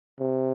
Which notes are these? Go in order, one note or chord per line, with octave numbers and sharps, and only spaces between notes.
C3